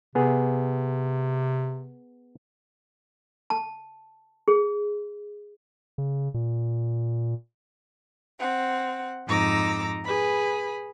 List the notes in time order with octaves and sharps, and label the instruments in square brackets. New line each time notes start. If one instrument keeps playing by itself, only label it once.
[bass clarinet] C3 [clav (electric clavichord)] B3 G#4
[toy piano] A5
G#4
[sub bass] C#3
A#2
[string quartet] C4 F#5
F2 G#2 D#4 A#5 D6 E6
G#4 B4 B5